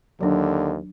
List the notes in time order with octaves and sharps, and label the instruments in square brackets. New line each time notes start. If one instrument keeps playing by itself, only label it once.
[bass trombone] D#2 [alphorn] D3 [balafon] F#3 D4